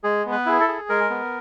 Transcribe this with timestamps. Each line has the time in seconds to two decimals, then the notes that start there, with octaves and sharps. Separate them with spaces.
0.04 G#3 G#4
0.26 B3
0.32 B4
0.46 E4 G#4
0.60 A4
0.68 G#4
0.89 G#3 A#4
1.10 B3